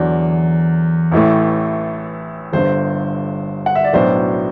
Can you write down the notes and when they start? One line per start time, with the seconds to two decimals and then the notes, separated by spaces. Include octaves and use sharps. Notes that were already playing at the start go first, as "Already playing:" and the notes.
Already playing: E2 D3 F#3 D5
1.12 A1 A2 E3 A3
2.53 G1 G2 D3 C5
3.66 F#5
3.75 E5
3.84 D5
3.93 B1 A2 F#3 B3 D4 C5